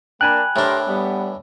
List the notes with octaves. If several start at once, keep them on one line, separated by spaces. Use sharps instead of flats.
A#3 D4 A#4 G5 G#5 B5 F#6
A2 D4 G4 A#4 C5
G3 B3